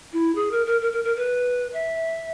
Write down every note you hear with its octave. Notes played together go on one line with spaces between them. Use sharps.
E4
G#4
A#4
A#4
A#4
A#4
A#4
B4
E5